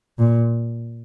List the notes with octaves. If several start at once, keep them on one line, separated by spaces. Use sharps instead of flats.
A#2